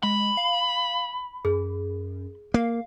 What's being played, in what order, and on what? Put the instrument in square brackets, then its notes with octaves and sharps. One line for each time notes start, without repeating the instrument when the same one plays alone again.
[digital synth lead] G#3 [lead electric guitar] B5
[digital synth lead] F5
[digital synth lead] F#2 [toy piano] G#4
[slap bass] A#3 [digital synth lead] F5